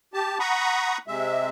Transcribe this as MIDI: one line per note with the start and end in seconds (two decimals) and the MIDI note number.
0.14 0.38 67
0.14 0.38 81
0.40 0.98 78
0.40 0.98 82
0.40 0.98 83
0.40 0.98 85
0.40 0.98 87
1.07 1.49 48
1.07 1.49 56
1.07 1.49 76